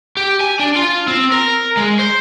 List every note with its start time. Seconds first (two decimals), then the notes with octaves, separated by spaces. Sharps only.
0.17 G4
0.41 G#5
0.59 D4
0.76 F4
1.08 C4
1.32 A#4
1.77 G#3
1.99 C5